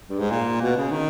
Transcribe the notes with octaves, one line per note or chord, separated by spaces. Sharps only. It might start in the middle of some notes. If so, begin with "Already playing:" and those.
G2
G#2
A#2
B2
C#3
D#3